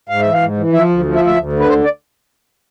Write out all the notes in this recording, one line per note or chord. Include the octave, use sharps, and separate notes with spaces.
G#2 F5
E3 E5
F5
G#2
E3
F3 E5
D2
F3
E5
D2
E5
D2
D3
B4
D2 C5
D5